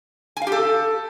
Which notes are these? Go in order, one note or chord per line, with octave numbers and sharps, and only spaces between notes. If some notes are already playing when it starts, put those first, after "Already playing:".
G#5
F5
G4
A4